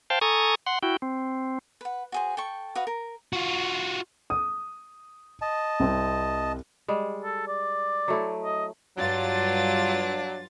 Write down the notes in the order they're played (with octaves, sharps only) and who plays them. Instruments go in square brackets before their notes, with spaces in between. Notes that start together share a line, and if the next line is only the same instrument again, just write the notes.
[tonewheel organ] C5 F5 G5 A5
A4 G#5 A#5 C#6 D#6
F#5 C6
E4 F#4 G5
C4
[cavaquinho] B4 F#5
F#4 G#4 C5
A4 G5 C#6
F#4 B4 F5 D#6
A#4
[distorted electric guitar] F4 F#4
[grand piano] D#6
[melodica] D#5 A5
[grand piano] C2 C4
[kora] G3 G#3
[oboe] A4
D5
[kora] F#3 A3 E4
[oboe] D#5
[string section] G2 F4 A6 [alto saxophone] F#3 [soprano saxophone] D4